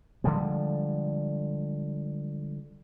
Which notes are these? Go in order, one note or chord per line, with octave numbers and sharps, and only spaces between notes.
D3 F3 G3 G#3